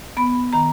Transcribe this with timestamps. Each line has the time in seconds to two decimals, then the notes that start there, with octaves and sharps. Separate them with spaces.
0.17 B3 B5
0.53 D#3 A#5